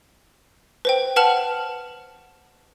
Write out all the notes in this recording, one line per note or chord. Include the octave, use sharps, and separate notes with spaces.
B4 C5 G5
B4 F#5 A5 F6 F#7